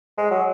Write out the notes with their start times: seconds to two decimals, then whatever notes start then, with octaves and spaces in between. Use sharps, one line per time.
0.18 G#3
0.31 F#3